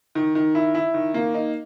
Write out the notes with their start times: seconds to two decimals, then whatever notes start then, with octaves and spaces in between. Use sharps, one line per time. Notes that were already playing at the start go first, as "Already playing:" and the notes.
0.15 D#3
0.35 D#3
0.55 E4
0.75 E4
0.94 D#3
1.14 A#3
1.34 D#4